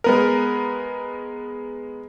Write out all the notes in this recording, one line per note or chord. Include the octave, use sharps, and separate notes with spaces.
G#3 B3 A#4